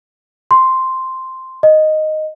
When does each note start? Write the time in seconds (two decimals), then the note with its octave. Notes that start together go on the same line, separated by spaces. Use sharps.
0.51 C6
1.63 D#5